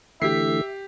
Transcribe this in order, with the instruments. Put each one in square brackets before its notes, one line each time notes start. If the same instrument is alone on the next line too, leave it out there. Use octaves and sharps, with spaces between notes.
[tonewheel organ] D3 E3 A3 [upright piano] G4 C7 [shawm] E5